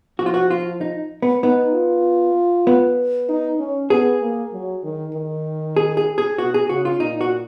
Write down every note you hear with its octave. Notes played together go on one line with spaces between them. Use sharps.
F3 F#4
F4
F#4
F4
D#4
B3
B3 D#4
F4
B3
D#4
C#4
B3 G#4
A#3
F#3
D#3
D#3
G#4
G#4
G#4
B2 F#4
G#4
C#3 F#4
F4
A#2 D#4
F#4